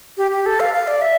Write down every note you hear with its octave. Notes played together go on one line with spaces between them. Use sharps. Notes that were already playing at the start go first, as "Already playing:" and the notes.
G4
G4
A4
F5
F5
D5
E5